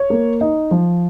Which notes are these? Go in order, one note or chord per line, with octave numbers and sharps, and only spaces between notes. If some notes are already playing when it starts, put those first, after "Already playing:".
Already playing: C#5
A#3
D#4
F3